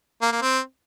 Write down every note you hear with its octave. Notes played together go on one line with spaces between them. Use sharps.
A#3
A#3
C4